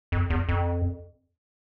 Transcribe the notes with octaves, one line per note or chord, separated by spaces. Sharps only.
F2
E2
F2